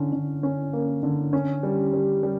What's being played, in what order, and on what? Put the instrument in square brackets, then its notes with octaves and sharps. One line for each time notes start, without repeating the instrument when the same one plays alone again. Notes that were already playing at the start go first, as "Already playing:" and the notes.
Already playing: [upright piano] D3 C#4
D3
C#4
A#3
D3
C#4
G3
G3
G3